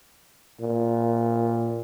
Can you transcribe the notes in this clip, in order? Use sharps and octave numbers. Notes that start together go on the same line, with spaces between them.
A#2